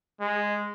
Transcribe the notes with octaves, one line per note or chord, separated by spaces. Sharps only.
G#3